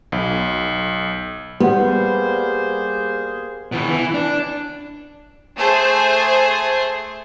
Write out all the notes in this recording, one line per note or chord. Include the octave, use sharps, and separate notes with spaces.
B1
G3 A#3 B3 G4 G#4 C5 F#5
B2 E3
E3
D4
A3 G#4 C5